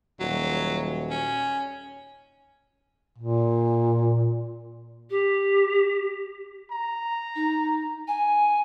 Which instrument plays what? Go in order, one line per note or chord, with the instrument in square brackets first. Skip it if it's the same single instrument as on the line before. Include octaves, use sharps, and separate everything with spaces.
[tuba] D#1 [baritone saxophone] F#3
[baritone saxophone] C#4
[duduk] A#2
[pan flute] G4
[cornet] A#5
[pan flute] D#4
G#5